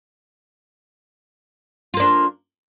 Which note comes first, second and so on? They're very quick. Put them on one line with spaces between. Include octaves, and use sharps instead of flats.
F4 A#3 D4